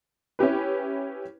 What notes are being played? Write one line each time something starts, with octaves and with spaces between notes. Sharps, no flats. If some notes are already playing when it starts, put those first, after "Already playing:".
C#4 E4 G4 B4